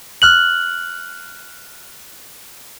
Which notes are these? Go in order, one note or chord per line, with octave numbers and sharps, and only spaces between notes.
F6 F#6 F#7